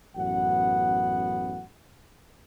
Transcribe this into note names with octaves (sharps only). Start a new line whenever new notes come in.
A1 F#2 B3 F#5